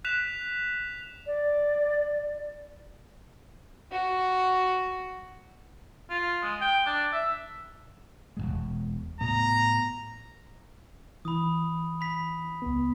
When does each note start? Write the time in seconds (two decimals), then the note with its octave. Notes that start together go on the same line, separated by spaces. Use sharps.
0.05 F#6 B6 E7 F7
1.26 D5
3.92 F#4
6.10 F4
6.42 G#3
6.61 G5
6.87 D4
7.13 E5
8.37 E1 C#2 G#3
9.21 A2 B3 A#5
11.25 E3 B5 D#6
12.01 B5 B6
12.62 C#2 B3